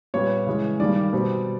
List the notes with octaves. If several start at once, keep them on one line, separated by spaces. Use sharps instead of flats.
A#2 G3 B3 C#5
C#3 E3 G#3
G2 D#3 G3 A#3 D5
B2 G3 C4